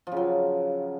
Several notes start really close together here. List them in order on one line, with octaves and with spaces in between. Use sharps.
F3 C#3 F#3